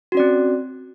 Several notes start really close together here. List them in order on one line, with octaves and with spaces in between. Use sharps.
F#4 C#4 D5 C4